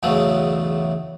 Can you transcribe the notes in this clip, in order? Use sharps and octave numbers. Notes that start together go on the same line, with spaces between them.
B1 E2 C#3 E3 F#3 A3